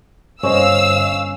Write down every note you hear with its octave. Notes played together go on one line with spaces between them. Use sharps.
G1 G2 C#4 C5 D#5 F5 E6